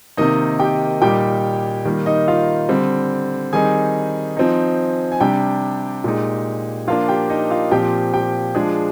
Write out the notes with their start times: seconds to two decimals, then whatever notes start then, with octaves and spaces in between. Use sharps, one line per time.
0.17 C3 D#3 A#3 D#4 D#5
0.60 G4 G5
1.02 A#2 G3 A#3 D#4 G4 G5
1.85 D#3 G3 A#3
2.06 D#4 D#5
2.28 F4 F5
2.69 D3 G3 C4
3.53 D#3 G3 C4 D#4 G#4 G#5
4.37 F3 C4 D#4
5.12 G#5
5.20 C3 G3 D4 G4 G5
6.04 A#2 G#3 D#4
6.88 F3 A#3 D4 F4 F5
7.09 G4 G5
7.30 D#4 D#5
7.50 F4 F5
7.71 A#2 F3 C4 G4 G5
8.14 G4 G5
8.55 F3 G#3 D4 G#4